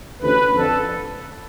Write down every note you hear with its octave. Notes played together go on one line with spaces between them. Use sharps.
D2 C3 E3 A3 C#4 B4
F2 D3 F3 A4